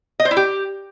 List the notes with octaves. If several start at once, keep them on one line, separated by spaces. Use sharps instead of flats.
D#5
C5
E4
G4